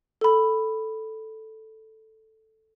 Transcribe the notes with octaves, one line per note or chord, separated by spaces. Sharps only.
A4 B5